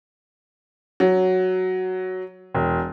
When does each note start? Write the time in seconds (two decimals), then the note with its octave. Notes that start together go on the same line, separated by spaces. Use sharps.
1.00 F#3
2.54 E1